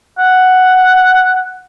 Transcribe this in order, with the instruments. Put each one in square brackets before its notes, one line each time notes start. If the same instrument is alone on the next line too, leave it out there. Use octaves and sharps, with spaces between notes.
[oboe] F#5